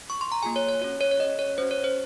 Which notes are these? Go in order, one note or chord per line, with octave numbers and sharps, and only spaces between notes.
C#6
C6
A#5
A#3 F4 G#4 G#5
C#5
C#5
C#4 F#4 C#5
C#5
C#5
C#4 G#4 D#5
C#5
C#4 F#4 C5
C#5
C5